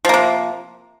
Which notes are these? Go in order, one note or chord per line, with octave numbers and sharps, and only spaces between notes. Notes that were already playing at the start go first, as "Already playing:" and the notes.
C3 F3 A#3